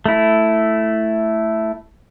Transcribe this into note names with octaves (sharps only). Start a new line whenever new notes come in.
A3 E4